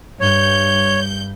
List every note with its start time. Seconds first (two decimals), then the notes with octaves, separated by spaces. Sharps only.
0.20 G2 C#5 G6